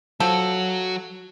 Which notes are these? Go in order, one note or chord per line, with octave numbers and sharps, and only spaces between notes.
F3 F#3 F#4 A4